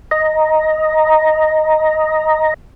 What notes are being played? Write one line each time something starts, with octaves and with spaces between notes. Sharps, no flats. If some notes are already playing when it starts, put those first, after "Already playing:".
D#5 A#5